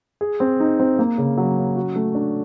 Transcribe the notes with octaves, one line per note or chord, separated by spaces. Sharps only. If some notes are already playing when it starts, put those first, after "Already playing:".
G#4
C4
D#4
C4
A#3
C#3
F#3
C#4
F#4
A3
D4